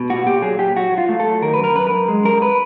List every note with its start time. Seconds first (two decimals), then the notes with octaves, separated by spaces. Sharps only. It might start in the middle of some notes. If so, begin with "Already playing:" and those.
Already playing: B2
0.10 A#2 F#4
0.26 A#2 G4
0.42 F#3 G#4
0.59 F#3 G4
0.76 F#3 F#4
0.92 F#3
0.98 F4
1.09 A3
1.20 A4
1.26 F#3
1.42 D#3 A#4
1.54 F#2 B4
1.64 A#4
1.75 F#2 B4
1.87 A#4
1.92 F#2
2.08 G#3
2.24 F#2 A#4
2.42 B4